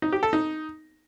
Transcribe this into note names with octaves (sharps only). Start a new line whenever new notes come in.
D#4
G4
A4
D#4